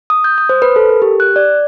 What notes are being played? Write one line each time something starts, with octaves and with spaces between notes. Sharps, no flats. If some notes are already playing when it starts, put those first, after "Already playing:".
D#6
G6
D#6
C5
B4
A4
A#4
G4
F#6
D5